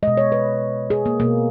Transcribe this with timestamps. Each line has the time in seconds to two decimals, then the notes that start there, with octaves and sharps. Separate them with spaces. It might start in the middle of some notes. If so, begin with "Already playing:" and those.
0.03 B2 G#3 D#5
0.17 C#5
0.32 B4
0.90 G#4
1.06 A#3
1.20 B2 A#3